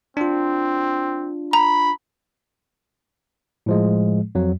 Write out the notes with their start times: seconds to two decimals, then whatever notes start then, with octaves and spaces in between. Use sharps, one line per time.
0.17 C4 D4 F4
1.53 A#5 B5
3.66 A2 F3 G#3
4.35 F2 F#3